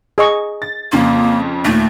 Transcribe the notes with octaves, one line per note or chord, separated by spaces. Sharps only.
G#4 D#5 C#6
A6
F2 C#3 A#3 C6
D#2 A#2 A3